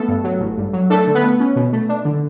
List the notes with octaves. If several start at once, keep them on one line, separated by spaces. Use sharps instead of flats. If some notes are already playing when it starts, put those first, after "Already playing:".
Already playing: A3 B3 A4
G2
F#3
A1
G2
F#3
A3 D4 A4
D3
B3 B4
A3
C#4
B2
A3
D4
D3